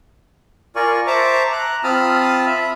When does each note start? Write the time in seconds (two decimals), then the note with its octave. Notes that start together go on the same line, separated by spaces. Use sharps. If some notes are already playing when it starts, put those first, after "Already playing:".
0.76 F4 A#4 D5 G#5 C#6
1.07 C5 E5 A5 A#5 C#6 D6
1.53 A#5 F#6
1.84 C4 F4 A5 B5 D#6 F6
2.47 E5 B5